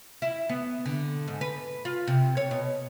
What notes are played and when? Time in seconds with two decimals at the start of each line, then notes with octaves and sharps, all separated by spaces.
0.22 E4
0.49 B3
0.86 D3
1.28 G#2
1.41 B4
1.85 F4
2.07 C3
2.37 C#5
2.51 B2